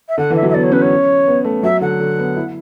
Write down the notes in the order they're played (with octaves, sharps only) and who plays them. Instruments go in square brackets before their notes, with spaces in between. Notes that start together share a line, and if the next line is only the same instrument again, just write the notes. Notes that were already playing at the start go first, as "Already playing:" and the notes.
[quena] E5
[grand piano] D3 [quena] F#5
[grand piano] E3
[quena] E5
[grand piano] F#3
[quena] E5
[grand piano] B3 [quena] D5
[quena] C#5
[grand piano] C#4 [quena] B4
[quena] C#5
[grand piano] B3
A3
[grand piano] F#3 [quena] E5
[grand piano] D3 [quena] F#5
[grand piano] D3
B3
E4